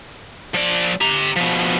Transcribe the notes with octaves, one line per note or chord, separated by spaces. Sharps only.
F3 D5
G4 A#5
B2 F3